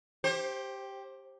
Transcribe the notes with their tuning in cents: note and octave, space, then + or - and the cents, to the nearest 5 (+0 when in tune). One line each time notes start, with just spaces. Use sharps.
G4 +0 C5 +25